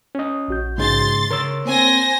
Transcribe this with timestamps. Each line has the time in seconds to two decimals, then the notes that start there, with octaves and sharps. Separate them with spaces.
0.15 C#4 D#5
0.48 A#1 F#4 G6
0.78 G#2 C#3 G#3 C6 A6
1.31 C#3 A#4 C#5 E6
1.65 A#3 C4 C5 G#5 A#6